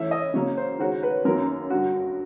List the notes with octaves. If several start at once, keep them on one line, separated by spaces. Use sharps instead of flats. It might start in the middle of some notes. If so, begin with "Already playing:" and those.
Already playing: E3 A3 C#4 E4 E5
D#5
C#3 F#3 A#3 C#5
C5
D#3 G#3 C#4 F#4 A#4 C5
B4
F#2 D#3 F#3 A#3 A#4
G2 D3 G3 F#4